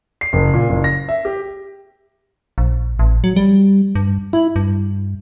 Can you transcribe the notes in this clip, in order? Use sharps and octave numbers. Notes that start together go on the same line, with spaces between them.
C7
F#1
A#2
F#1
A#6
E5
G4
A#1
A1
F#3
G3
G2
E4
G2